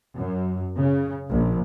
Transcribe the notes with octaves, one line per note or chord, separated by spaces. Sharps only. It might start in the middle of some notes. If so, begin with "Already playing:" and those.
F#2
C#3
A#1